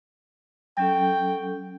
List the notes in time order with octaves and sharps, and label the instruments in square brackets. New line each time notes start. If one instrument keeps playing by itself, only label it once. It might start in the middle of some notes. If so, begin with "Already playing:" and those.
[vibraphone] F#3 C#4 A4 [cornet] G5